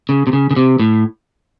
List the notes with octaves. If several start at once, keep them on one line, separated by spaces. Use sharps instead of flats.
C#3
C3
C#3
C#3
C3
A2